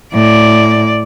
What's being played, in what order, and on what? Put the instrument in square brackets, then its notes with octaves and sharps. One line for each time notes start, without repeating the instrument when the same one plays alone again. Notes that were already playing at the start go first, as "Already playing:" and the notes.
[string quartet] A2 [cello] D5